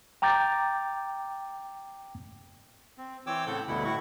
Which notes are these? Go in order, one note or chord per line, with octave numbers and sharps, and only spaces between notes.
G5 A#5 D6 G6 A6
C4
E3 C4 C#5 G5 D6 E6
A2 C#3 C4 A4 F#5 G6
D2 G2 B2 D3 E4 F#5
A2 E4 F#4 C#6